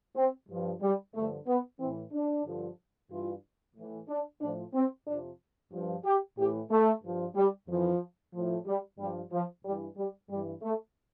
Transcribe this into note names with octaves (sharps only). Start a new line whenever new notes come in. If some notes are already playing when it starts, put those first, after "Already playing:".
C4
G2 F3
G3
G2 D3 F3 A3
B3
A2 E3 C4
D4
G2 D3 F3
G2 E3 F4
A2 E3
D4
A2 F3 D4
C4
F2 C3 F3 D4
G2 F3
G4
A2 E3 G4
A3
G2 F3
G3
F2 E3 F3
A2 F3
G3
G2 F3 G3
F3
G2 E3 G3
G3
G2 E3 G3
A3